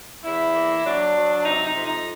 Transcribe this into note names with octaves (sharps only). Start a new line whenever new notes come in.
E2 E4
A#3
F#3 D4
F#3
C3 D#4
D#4
F2
D#4